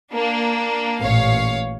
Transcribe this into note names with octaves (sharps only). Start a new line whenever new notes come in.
A#3 D4
A1 A#2 C#5 F5